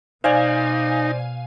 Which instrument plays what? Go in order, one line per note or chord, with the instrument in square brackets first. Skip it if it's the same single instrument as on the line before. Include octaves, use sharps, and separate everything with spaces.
[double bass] B2 [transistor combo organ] D#4 [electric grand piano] C5 D5 [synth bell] F5 G#5